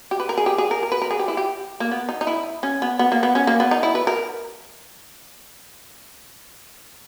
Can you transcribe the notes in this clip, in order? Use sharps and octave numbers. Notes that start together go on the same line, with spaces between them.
G4
B4
A#4
G#4
G4
G#4
A#4
A#4
B4
A#4
G#4
G4
E4
G4
A#3
B3
D#4
D#4
E4
C#4
B3
B3
A#3
B3
C#4
A#3
B3
D#4
E4
B4
A#4